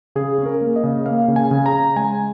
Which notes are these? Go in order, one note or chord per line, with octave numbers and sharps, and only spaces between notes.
C#3 G#4
C#4
A#4
A#3
D#5
C#3
A#3 F5
C#3
G#5
C#3
A#5
C#3
G#3 G#5